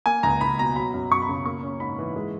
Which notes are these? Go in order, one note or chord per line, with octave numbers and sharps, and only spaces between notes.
A#3 G#5
C#2 A#5
C#2 B5
B2 A#5
F#3 B5
F#2
F#2 C#6
B5
C#3
A#3 C#6
C#4
G#2 B5
E3
G#3